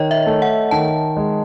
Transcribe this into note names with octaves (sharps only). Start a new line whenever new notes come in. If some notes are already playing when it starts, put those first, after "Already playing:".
Already playing: D#3 C#5 D#5
E5
A3
F#5
D#3 A5
G#3